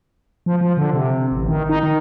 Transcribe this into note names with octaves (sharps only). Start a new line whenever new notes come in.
F3
F3
D3
C3
A1
D#3
D#4
D#3